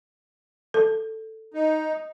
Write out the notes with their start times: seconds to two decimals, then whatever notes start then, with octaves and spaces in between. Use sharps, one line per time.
0.74 A4
1.54 D#4